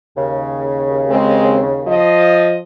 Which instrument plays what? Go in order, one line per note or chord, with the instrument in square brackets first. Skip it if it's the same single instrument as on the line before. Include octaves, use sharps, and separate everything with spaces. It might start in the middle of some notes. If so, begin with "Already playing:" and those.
[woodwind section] D#2 C#3
[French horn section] G#3 C4
F3 D#5